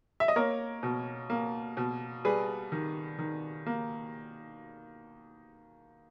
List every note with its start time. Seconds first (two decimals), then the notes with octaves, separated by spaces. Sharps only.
0.20 E5
0.28 D#5
0.36 A#3 A#4 C#5
0.83 B2
1.30 A#3
1.77 B2
2.25 G3 G#4 B4
2.72 D#3
3.19 D#3
3.67 A#3